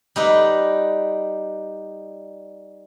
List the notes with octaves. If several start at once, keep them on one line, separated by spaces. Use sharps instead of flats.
G3 D#4 B4